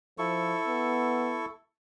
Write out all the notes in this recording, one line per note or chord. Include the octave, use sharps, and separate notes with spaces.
F3 E4 A4 C#6
B3